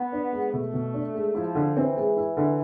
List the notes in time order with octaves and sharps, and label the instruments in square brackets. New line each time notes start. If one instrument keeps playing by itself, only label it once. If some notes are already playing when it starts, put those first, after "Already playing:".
Already playing: [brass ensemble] B3
[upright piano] D4
G#3
[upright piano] B2 [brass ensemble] A3
[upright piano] B2
D4
G#3
[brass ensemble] F3 [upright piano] E4
[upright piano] D3
[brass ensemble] E3 [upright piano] C4
[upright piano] G#3
E4
D3